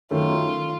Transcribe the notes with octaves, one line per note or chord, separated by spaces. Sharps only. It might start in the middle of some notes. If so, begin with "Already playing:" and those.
F#2 D#3 A3 F4